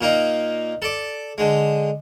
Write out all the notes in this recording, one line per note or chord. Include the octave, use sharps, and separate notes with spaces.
A#2 A#3 D#4
A4 D5
D3 G#3